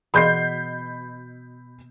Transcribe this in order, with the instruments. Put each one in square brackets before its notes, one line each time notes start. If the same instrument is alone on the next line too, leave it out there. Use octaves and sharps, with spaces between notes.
[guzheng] B2 [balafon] E3 G#4 C6 [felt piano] B5 G6 C7